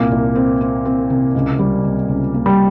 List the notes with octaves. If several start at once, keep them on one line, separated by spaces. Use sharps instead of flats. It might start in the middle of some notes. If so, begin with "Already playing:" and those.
Already playing: C2 A#2 A#3
C2
C4
C4
C4
C3
C#2
G3
C3
C#2
A#3
G3